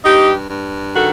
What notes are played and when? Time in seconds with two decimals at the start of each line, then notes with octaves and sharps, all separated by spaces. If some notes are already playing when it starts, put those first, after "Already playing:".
0.05 G2 D#4 G4
0.50 G2
0.95 D#3 F#4 A4